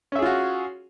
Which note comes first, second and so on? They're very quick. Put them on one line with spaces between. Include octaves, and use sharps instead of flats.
C#4 E5 G#4 F4 F#4